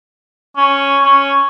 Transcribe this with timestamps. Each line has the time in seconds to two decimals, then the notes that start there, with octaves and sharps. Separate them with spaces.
0.57 C#4
1.04 C#4